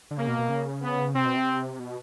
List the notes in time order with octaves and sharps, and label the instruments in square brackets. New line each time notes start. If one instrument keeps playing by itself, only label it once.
[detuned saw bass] D3
[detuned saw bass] C#3 [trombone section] A#3
[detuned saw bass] B2
B2
C#3
[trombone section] B3
[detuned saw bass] C3 [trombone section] C4
[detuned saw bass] B2
C3
B2